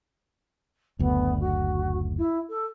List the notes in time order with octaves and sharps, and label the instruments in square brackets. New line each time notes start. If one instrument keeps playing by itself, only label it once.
[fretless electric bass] F#1 D2 [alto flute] B3
[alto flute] F#4
E4
A4